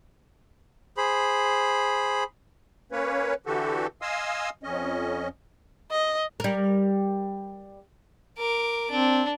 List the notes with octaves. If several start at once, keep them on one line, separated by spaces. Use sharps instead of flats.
G#4 C5 B5
A#3 C#4 B4 C#5
D3 E3 F#4 G4 A4
D#5 F5 G#5 C6 D#6 E6
F2 C#4 D#5
D#5
G3 A#4
A#4 D6
C4 D4